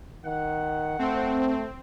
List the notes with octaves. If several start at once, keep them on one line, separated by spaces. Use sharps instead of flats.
D#3 F#5
A3 C4